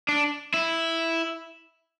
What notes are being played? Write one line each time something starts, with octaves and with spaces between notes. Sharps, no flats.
D4
E4